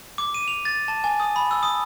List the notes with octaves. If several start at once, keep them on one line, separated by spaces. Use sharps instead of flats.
D6
D#7
F7
A6
A5
G#5
D#6
B5
E6
D#6